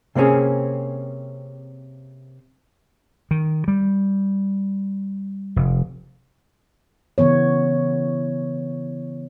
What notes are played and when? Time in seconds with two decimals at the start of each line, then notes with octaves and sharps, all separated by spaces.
0.15 C3 A#3 C4 C#4 G#4
3.31 D#3
3.68 G3
5.56 F1
7.18 C#3 E3 B3 C#5